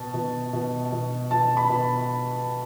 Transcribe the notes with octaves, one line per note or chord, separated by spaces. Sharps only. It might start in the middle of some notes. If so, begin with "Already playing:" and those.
Already playing: B2 A5
B2
B2
B2
B2 A5
B5
B2